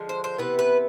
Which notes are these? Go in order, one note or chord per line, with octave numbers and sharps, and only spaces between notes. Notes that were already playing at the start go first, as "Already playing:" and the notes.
Already playing: D3 F3 G#3
C5
C5
C3 E3 B3 B4
B4